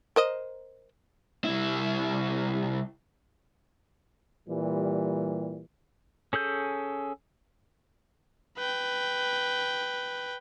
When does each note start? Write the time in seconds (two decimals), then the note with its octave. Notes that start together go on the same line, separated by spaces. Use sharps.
0.16 A#4 C5 D#5
1.44 C2 E4
4.48 A#2 E3 G3
6.33 C#4 G#4 A4 G6
8.58 B4 G5